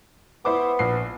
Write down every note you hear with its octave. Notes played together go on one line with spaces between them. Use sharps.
B3 E4 C5 D6
A#1 C7